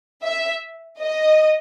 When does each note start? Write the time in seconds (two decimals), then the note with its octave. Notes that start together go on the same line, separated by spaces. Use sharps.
0.24 E5
0.99 D#5